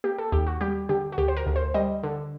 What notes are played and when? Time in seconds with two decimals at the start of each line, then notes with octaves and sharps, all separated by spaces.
0.04 A#3 G4
0.18 A4
0.32 D#2 G4
0.47 F#4
0.61 G3 G4
0.89 D3 G4
1.12 F#4
1.18 D2 G4
1.28 C5
1.37 A#4
1.46 D2
1.56 C5
1.74 G3 D#5
2.03 D3